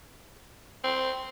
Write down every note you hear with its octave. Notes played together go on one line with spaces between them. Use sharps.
C4